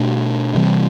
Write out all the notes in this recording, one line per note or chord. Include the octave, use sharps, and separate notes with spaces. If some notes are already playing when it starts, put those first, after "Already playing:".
Already playing: B2 A3 D4
C3 E3 G3 C4